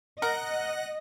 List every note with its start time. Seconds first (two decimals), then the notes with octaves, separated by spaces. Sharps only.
0.22 A#4 D#5 F#5 F#6 A#6